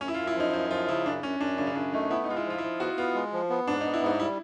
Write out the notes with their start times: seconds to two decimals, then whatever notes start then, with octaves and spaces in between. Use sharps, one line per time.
0.01 F#2 C#4
0.08 E4
0.14 F4
0.18 F#2
0.27 E4
0.36 F3 D#4
0.53 F#2 D#4
0.71 F3 F4
0.88 C#3 E4
1.06 F#2 D4
1.23 F#2 C#4
1.40 F#2 D4
1.58 C#3 D4
1.67 C#4
1.76 F#2 D4
1.93 A3 D#4
2.10 B3 E4
2.24 D#4
2.28 G#3 F4
2.37 E4
2.46 F3 F4
2.58 E4
2.62 F3 F4
2.80 B3 F#4
2.97 B3 F4
3.15 G#3
3.33 F3
3.50 B3
3.67 G#2 D4
3.81 D#4
3.84 B3
3.93 E4
4.02 G#2 D#4
4.20 G3 E4